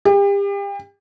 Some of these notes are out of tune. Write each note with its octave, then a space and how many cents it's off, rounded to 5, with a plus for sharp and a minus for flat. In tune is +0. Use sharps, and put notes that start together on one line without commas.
G4 +35